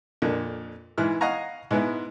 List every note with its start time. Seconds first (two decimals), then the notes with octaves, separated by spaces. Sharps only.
0.22 F2 A#2 D3
0.98 G#2 E3 E4 F6 F#6
1.21 D#5 F5 F#5 G#5 A#5 C#6
1.71 G#2 G#3 B3 E4